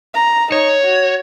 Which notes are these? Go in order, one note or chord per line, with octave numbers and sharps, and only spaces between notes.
A#5
D#4 C#5
F#4